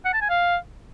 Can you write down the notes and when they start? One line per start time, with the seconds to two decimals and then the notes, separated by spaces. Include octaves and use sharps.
0.05 F#5
0.13 A5
0.22 G#5
0.30 F5